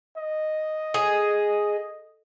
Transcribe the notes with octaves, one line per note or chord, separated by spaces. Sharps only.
D#5
G#4